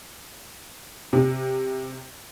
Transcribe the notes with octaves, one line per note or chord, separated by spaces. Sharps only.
C3